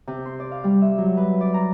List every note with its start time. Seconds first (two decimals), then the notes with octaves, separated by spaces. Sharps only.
0.07 C3
0.25 C6
0.40 D5
0.52 F5
0.64 G3
0.82 E5
0.98 F#3
1.17 B4
1.41 D5
1.54 A#5